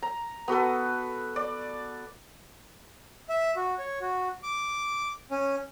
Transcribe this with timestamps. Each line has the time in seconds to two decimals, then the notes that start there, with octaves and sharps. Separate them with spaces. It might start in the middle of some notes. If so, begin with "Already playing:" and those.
0.02 A#5
0.48 B3 F#4 A4 B4
1.36 D5
3.29 E5
3.56 F#4
3.78 C#5
4.01 F#4
4.43 D6
5.31 C#4